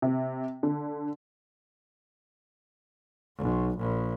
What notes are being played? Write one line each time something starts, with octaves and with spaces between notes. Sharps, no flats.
C3
D3
B1
A#1